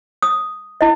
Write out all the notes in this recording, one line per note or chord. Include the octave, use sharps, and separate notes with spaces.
D#6
E4 D#5